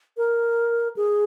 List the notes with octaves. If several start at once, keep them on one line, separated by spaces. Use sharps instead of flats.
A#4
G#4